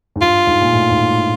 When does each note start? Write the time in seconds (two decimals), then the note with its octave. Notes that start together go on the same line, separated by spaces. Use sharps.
0.16 G#2
0.21 G2 F4
0.47 G#2
0.61 A#2
0.72 A2
0.90 G#2
0.98 A2